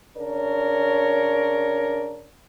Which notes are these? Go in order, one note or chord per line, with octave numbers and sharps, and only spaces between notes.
C#3 D4 A#4 C#5 D5